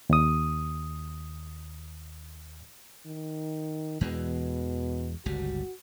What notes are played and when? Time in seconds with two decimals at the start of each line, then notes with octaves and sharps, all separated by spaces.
0.10 D#2 D#6
3.06 D#3
4.01 E2 B2 E3 G#3
5.26 G1 C#2 G3 F#4